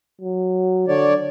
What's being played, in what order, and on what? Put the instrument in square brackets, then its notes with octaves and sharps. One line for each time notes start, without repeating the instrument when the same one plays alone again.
[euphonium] F#3
[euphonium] D3 [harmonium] C#5 D5